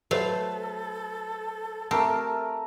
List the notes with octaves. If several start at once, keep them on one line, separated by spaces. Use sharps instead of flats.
F#3 A3 A4 B4 C5 F5
A3 C4 G4 A#4 A5 E6